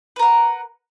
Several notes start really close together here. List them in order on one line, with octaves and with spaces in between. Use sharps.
B4 A#4 F#5